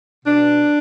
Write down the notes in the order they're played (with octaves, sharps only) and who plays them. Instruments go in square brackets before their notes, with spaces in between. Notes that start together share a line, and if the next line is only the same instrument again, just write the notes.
[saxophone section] B2 D4